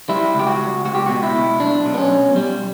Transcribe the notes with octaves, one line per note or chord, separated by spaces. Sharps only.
G3 E4
C#2 G4
F#4
C#2
C#2 F#4
G4
B2 F#4
E4
B2
B1 D4
B2
B3
C#4
B1
B1 G3